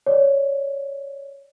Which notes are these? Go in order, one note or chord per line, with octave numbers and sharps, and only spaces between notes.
C#5 D5